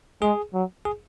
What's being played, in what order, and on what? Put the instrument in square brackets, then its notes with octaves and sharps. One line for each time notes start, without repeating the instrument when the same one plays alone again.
[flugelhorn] G#3 [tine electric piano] G#4
[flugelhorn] F#3
[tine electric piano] G#4